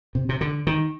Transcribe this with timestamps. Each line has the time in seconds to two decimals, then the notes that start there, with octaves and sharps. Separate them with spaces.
0.15 C3
0.29 C3
0.41 D3
0.67 D#3